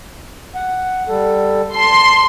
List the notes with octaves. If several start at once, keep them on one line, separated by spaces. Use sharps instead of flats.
F#5
G3 A4
A5 C6